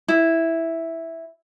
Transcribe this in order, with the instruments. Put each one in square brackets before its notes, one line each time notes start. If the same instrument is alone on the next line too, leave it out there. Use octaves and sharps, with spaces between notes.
[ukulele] E4